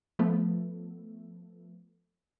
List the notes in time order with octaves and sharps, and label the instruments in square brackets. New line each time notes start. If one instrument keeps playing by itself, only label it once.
[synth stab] F3 A3 B3 A4